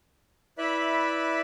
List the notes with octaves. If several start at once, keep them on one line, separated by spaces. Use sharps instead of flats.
E4 B4 D5 E5 B5 F#6